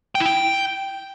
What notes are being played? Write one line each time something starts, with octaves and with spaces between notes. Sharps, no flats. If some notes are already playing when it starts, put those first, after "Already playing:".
G5
E4
G5